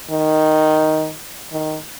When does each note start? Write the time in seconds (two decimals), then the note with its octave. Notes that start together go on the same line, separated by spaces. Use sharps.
0.11 D#3
1.52 D#3